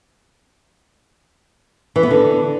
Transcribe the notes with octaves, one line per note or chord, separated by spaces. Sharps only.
E3
B3
D3